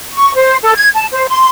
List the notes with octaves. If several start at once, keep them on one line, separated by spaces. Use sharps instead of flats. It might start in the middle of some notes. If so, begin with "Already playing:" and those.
C#6
C5
A4
G#6
A5
C5
C6